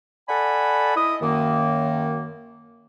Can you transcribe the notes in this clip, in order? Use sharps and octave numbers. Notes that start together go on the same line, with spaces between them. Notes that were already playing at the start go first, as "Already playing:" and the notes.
A4 D5 F#5 G#5 A5 B5
E4 D#5 D#6
F#2 D#3 A#3